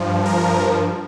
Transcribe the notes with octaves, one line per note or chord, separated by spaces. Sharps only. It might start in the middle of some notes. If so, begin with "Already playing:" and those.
Already playing: G2 F3
A#4